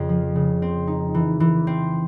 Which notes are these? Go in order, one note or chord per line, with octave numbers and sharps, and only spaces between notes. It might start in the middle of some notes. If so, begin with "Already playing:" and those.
Already playing: F2 C#3
F3
C#3
C4
D#4
E3
E3
C4